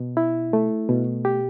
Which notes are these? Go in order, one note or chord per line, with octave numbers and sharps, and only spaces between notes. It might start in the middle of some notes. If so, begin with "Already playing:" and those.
Already playing: B2
E4
A3
B2
G4